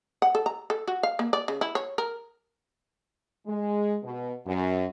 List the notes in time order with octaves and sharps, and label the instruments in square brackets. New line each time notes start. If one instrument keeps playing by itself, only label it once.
[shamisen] F#5
A4
A#5
A4
F#4
F5
A#3
D5
C#3
E4
C#5
A#4
[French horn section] G#3
B2
F#2